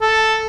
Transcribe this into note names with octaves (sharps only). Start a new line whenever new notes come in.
A4